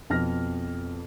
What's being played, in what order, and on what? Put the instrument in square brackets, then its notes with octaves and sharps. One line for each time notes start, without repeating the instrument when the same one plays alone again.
[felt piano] F2 B2 F6 A#6